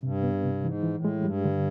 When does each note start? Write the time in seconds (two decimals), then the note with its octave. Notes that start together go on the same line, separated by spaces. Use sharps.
0.03 G2 C3
0.24 B3
0.44 C3
0.64 G#2 E3
0.83 E3
0.94 A2
1.05 G#3
1.24 G2 G3
1.45 D3